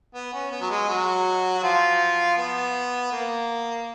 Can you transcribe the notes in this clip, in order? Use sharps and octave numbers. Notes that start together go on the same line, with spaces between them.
B3
C#4
B3
F#3
G#3
F#3 F#4
F#4
F3 F4
B3
A#3